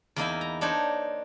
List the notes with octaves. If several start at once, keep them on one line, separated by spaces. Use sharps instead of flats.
E2 A#3 D#4 E4
A#5
D4 D#4 C5 C#5